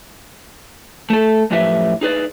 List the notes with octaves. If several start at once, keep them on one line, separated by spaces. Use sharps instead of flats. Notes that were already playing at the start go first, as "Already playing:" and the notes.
A3 A4
F#2 A2 F3 G4 B4 E5
D#4 G#4 B4 D5